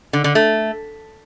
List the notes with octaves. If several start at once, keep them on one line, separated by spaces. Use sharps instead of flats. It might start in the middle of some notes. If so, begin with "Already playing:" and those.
D3
D3
A3